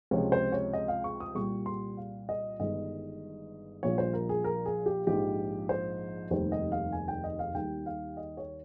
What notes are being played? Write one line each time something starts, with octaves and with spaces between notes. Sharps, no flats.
C#2 C3 F3 C#5
C5
C#5
D#5
F5
C#6
D#6
C2 A#2 G3 C#6
C6
F5
D#5
G1 G2 D#3 G#3 D#5
A#1 A#2 G3 C#5
C5
A#4
G#4
A#4
G#4
G4
A#1 G#2 F3 G4
C5
F1 D#2 D#3 G3 C5
D#5
F5
G#5
G5
D#5
F5
D#2 D#3 G3 G5
F5
D#5
C#5